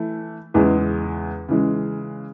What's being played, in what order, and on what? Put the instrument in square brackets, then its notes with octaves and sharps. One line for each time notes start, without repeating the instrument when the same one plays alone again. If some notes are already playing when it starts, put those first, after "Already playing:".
Already playing: [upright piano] E3 A3 E4
E2 C#3 E3 G#3
C#3 E3 G#3